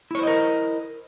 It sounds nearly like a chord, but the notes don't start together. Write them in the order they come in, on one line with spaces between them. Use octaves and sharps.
E4 C#5 C5 D#5 A#4